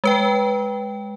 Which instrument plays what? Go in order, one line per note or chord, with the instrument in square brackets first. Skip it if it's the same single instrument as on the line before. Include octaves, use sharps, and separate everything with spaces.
[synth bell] G#3 B4 G5